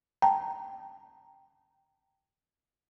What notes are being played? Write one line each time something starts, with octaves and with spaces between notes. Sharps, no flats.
G5 A5 A#5